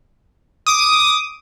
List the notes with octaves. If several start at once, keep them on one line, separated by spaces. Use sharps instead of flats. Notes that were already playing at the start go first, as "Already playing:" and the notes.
D6 D#6